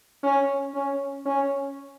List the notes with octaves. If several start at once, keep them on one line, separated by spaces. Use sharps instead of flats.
C#4
C#4
C#4